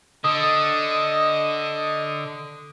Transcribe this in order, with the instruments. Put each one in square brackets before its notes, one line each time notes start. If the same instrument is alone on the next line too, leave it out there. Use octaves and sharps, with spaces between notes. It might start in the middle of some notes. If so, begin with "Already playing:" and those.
[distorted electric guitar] D3 [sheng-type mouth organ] D#5 [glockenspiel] D#6